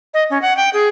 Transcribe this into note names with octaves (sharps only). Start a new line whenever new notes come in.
D#5
C#4
F#5
G5
G#4